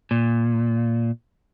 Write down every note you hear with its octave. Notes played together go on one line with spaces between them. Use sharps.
A#2